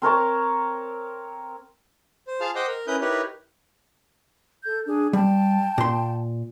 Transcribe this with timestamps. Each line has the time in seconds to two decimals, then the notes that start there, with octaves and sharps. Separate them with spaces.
0.02 C4 A#4 C#5 A5
2.27 C5
2.41 F4 G#4 F5 A5 F6
2.55 C5 D#5 F#5 G5 C6 D6
2.67 A#4
2.87 C#4 E4 A#4 B4 D#6 G6
3.01 D#4 E4 G4 A#4 B4 C#5
4.65 A4 G6
4.86 D4 G#4
5.13 G3 G5 A5
5.78 A#2 C6